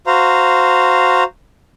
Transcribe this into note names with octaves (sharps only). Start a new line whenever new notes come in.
F#4 C5 F5 A#5